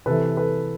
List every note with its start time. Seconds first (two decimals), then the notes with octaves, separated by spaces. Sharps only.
0.06 C3 E3 A4 B4
0.37 A4 B4